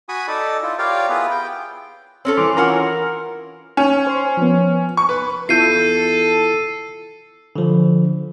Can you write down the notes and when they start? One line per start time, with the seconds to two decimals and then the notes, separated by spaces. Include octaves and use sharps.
0.09 F#4 G#5 B5 C#6 D#6
0.28 D#4 A4 D5
0.63 E4 F4
0.79 F4 G4 A#4 C#5 D5 F5
1.09 B3 E4 F4 G#4 B4
1.31 G5
2.25 C4 C#4 A4 C#5
2.37 E3 C6 D6
2.57 C#4 E4 F4 A#4 F#5 A#5
3.77 C#4
4.07 C5 C6
4.37 F3 B3
4.97 C#6
5.09 B4
5.49 E2 E4 F4 A4 G6 C7 D#7
7.56 D3 F3